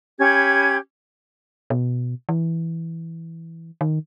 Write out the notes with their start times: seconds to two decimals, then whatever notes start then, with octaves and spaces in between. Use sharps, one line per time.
0.20 C#4 G4 B5 G#6
1.70 B2
2.29 E3
3.81 D#3